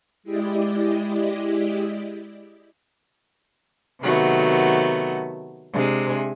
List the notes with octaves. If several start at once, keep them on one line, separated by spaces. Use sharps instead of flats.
G#3 E4 G4 D5 D#5
C3 D#3 F#3 A3 B3
C3 G#3 D4 G#5